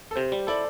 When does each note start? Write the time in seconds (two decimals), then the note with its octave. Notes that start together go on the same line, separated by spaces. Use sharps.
0.11 A4
0.16 C3 C5
0.32 G3
0.47 E4 A4 D5